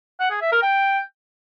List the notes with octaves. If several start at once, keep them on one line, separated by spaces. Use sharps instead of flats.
F#5
G#4
E5
A#4
G5